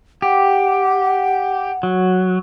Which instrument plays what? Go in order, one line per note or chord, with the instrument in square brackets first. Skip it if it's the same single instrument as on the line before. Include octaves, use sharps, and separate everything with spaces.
[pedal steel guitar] G4 [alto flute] F#5
[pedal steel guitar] F#3